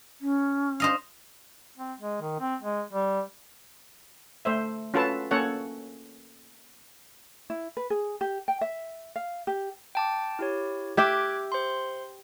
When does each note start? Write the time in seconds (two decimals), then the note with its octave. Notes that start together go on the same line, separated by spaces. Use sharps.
0.21 C#4
0.80 C5 D#5 F5
1.78 C4
2.00 G#3
2.22 D#3
2.40 C4
2.62 G#3
2.93 G3
4.45 A3 C5 E5
4.94 C#4 F4 F#4 A4 B4 A5
5.31 A#3 C#4 A4 C#5 F#5
7.50 E4
7.77 B4
7.90 G#4
8.21 G4
8.48 G5
8.61 E5
9.16 F5
9.47 G4
9.95 G5 A5 D6
10.39 E4 G4 C#5
10.97 G4 E5 G5 D6 F#6 G#6
11.52 C5 C6